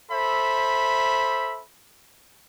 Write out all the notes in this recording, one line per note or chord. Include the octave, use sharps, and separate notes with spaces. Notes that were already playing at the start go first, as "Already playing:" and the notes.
A4 C5 E5 B5